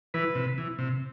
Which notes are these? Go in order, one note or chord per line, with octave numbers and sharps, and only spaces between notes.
E3 B4
C3
E3
C3